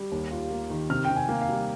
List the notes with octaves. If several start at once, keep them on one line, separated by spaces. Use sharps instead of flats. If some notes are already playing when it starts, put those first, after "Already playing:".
Already playing: G3
D#2
F4
A#3
D#3
C3 F6
C3 G5
G#5
A#3
F5
G3